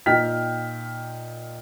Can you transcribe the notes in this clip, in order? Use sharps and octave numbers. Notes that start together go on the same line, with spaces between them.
A#2 D#4 G5 F6 B6